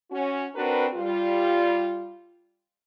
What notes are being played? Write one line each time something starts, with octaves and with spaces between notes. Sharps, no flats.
C#4 F#4
C4 D4 F#4 A#4 B4
G3 F4